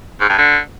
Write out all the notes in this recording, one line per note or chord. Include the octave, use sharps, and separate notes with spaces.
G#2
G2
D3